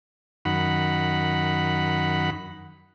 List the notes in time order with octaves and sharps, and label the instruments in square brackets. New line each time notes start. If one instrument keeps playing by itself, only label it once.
[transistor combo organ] F#2 D#3 F#5 B5